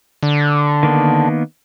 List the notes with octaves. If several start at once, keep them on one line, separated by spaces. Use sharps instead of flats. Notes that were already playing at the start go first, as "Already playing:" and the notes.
D3
D#3 A#3 B3